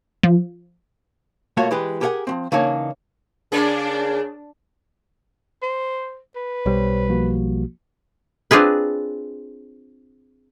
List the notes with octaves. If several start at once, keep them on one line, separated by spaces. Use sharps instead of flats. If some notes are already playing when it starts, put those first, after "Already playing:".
F3
B1 A3 A#3 F4 F#4 C#5
E3 G#3 G4 B4
G4 G#4 A#4 C#5 F#5 G#5
F3 F#3 C4
C#3 E3 A#3 D4 D#4 C#5
C#3 A#3 D4 G#4
C5
B4
B1 G3 C5 C#5
F3 A#3 F#4
C4 D4 F4 G#4 B4